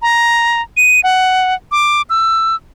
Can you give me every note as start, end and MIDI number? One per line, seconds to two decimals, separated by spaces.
0.02 0.61 82
0.77 1.00 99
1.04 1.54 78
1.72 2.02 86
2.10 2.55 88